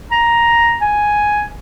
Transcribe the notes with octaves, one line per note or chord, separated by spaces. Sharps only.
A#5
G#5